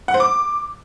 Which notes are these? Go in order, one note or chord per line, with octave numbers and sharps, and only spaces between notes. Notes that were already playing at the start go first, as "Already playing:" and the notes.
F#5
C5
D6